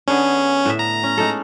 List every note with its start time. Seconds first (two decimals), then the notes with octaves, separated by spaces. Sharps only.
0.08 D3 B3 C#4 G#4
0.65 A2 E5
0.79 A#5
1.03 C#4
1.18 G#3 D#4 A4